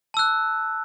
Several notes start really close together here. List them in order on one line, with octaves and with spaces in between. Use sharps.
A5 E6 F#6